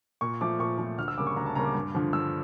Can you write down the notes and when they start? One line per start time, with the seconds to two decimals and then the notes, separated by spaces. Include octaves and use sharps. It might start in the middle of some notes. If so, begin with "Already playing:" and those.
0.21 A#2 C#6
0.41 F3 A3 D6
0.59 A#2 C#6
0.79 F3 A3
0.98 D2 F6
1.08 E6
1.18 C#3 G3 A#3 D6
1.27 C#6
1.36 D2 A#5
1.46 A5
1.55 C#3 G3 A#3 A#5
1.65 D6
1.75 G2
1.95 D3 F3
2.13 G2 E6